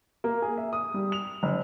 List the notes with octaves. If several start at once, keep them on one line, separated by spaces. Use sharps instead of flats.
A#3
G#4
E5
D#6
G3
F7
F#1